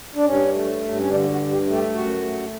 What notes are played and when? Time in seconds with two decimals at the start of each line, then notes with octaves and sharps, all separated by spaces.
0.15 D4
0.24 G2 C#4
0.53 A3
0.81 G2
0.99 C#4
1.09 D3 D4
1.31 F#4
1.37 G2
1.52 G4
1.66 A3
1.73 G4
1.94 F#2 F#4
2.22 A3